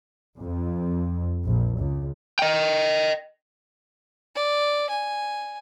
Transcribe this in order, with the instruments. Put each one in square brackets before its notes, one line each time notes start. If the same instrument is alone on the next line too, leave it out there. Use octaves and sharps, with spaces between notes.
[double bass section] F2
A#1
C#2
[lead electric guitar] D#5 G5
[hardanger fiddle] D5
G#5